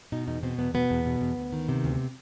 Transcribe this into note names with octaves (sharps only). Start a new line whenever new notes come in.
B2 D#4
E2 D#4
B2 C4
E2 B3
B2 B3
E2
B2
E2
D2
D#3
C3
D2